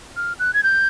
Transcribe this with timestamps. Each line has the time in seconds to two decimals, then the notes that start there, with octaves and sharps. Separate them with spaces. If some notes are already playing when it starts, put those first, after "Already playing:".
0.17 F6
0.39 F#6
0.54 G#6
0.63 G6